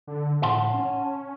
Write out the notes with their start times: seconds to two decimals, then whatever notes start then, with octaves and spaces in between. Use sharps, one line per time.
0.07 D3
0.43 A2 F#5 A5 C6
0.74 C#4